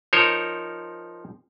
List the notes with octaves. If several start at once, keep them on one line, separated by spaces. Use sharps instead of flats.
F3 D#4 A#4 C5 C#5